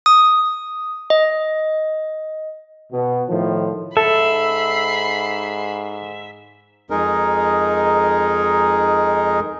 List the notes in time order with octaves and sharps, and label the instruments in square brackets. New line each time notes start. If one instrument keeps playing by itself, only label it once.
[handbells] D#6
D#5
[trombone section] B2
A2 D#3 F3
[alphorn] G#2 [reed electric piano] A4 [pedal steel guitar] E5 [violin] B5 C7
[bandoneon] F2 G#3 D#4 G#4 A#4